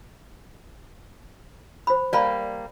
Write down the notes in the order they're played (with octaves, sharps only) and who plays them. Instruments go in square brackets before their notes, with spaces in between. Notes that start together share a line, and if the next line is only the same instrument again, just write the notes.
[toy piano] C5 B5
[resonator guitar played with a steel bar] G3 A#3 [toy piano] D5 A5 B5